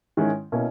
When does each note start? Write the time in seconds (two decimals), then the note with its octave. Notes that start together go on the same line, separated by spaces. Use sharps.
0.17 G#2 D#3 G#3 C#4 E4
0.52 B2 A#3 C#4 E4